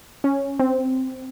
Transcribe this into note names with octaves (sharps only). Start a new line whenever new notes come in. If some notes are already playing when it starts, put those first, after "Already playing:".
C#4
C4